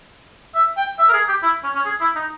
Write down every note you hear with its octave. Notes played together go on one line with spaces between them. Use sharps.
E5
G5
E5
A#4
G#4
G4
E4
C#4
C#4
G#4
E4
D#4